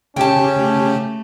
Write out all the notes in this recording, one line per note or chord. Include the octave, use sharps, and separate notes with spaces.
C#3 C#4 G4 G5 A5
A3